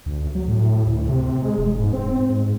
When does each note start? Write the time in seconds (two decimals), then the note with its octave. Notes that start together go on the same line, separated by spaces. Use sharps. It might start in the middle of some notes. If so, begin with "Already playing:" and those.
0.06 D2
0.35 F#3
0.48 A2
0.87 D2
1.09 C3
1.42 G#3
1.58 E1
1.79 G#2
1.93 C4
2.30 G#2